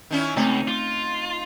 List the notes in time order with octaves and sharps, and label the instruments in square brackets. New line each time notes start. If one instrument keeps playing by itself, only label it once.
[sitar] D#3 C#4 E4
[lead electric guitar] C#2 [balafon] A3 C4 [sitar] D#4
[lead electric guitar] F4